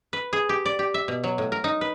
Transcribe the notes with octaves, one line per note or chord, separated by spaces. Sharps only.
B4
G#4
G4
D5
G4
E5
B2
F#3
A2
A#4
D#4
B4